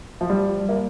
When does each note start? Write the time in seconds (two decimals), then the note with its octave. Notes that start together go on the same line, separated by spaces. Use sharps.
0.21 F3
0.30 G3
0.69 A#3